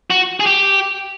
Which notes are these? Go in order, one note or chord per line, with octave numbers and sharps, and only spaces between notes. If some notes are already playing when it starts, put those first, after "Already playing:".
F#4
G#4
G4